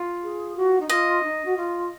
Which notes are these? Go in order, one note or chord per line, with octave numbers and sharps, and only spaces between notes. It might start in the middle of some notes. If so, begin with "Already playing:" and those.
Already playing: F4
G#4
F#4
D#4
F4 D#5
D#4
F#4
F4